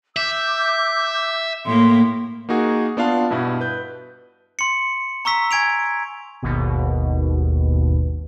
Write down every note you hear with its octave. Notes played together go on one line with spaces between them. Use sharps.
E5 D6 E6 G6
A2 A#3 C6
A#3 D#4 F#4 G#4
B3 D4 F4 F5 A5
G2 B2 E4
B4 G6
C6 C#7
A#5 C#6 E6 B6
G#5 G#6 D7 F7
G#1 D#2 B2